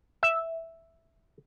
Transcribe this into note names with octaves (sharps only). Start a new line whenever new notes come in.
E5